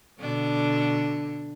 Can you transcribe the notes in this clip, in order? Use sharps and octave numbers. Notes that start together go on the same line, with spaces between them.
B2 D3 D4